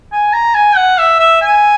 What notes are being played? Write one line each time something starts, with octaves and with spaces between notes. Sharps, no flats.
G#5
A#5
G#5
F#5
E5
E5
G#5